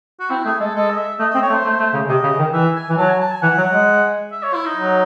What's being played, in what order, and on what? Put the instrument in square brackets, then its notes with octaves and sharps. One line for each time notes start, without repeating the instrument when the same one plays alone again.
[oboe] F#4
[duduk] C4 [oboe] E4
[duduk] A3 [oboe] G#4
[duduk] G#3 [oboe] A4
[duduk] G#3 [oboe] A4
[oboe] D#5
E5
[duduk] A3 [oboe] D#5
[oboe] D#5
[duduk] C4
[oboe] C#5
[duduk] A3
[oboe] C5
[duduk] A3
A3
C#3
[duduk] C3 [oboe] D#5
[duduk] C#3
D#3
[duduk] E3 [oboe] E5
[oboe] G#5
[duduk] E3
[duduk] F#3 [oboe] A5
[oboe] G#5
A5
G#5
[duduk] E3 [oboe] F#5
[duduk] F#3
G#3
[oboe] E5
C#5
E4
D#4
[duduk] F#3